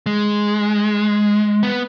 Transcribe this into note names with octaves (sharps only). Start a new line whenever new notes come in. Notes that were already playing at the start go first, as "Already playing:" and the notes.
G#3
B3